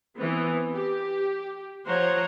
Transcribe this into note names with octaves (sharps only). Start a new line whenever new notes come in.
E3 B3 C4
G4
F3 C5 C#5 F#5 A#5